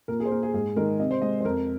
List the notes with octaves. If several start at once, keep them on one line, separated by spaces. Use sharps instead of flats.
A#2 A#4
G#4
C5
A#3 A#4
G#4
G#2 G#4
D#3 G#3 A#4
C3 D#5
C5
G#3 D#5
C5
F2 A#4